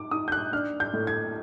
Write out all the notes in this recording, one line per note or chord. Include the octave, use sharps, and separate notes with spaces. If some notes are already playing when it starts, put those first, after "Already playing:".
Already playing: D#4 D6
D#4 D#6
G6
F#6
D4 F6
G6
A2
G#6